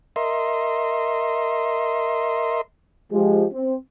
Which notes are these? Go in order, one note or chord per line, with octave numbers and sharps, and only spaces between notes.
A#4 D#5 E5 C6
F3 G#3 G4
C4